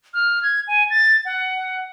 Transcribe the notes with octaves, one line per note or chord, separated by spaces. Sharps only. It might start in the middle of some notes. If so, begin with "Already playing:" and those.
F6
G#6
G#5
A6
F#5